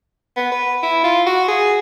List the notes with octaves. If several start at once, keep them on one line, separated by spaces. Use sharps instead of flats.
B3
B4
E4
F4
F#4
G#4